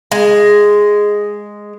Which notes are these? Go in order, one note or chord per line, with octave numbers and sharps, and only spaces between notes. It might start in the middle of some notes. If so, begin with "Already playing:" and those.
G#3